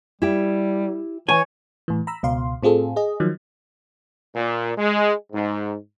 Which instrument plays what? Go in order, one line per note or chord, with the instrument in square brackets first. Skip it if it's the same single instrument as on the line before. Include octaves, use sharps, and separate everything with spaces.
[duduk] G3 [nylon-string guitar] E4 G4
[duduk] E3 [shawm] C#5 [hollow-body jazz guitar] G#5
[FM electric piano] A2 E3
A#5 B5 E6
C#2 B2 F5 C6
A2 C4 F4 G#4 A4
G#4 D#5
D#3 F3 F#3
[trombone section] A#2
G#3
G#2